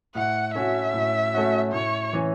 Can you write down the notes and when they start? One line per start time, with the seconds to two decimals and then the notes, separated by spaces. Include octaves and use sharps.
0.15 A2 F#5
0.54 A3 C#4 F#4 E5
0.94 A2
1.34 A3 C#4 F#4
1.73 A2 C#5
2.13 E3 C#4